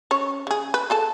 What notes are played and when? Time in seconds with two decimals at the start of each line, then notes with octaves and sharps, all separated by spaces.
0.11 C#4 C#5
0.47 C#3 G#4
0.74 B4
0.90 G#4 A4 A5